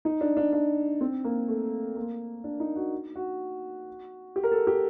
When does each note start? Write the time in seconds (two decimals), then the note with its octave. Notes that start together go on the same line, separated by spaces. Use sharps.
0.05 D#4
0.21 D4
0.37 D4
0.53 D4
1.01 C4
1.24 A#3
1.48 A3
1.96 A#3
2.44 D4
2.60 D#4
2.76 F#4
3.16 F#4
4.36 G4
4.44 A#4
4.52 A4
4.67 G4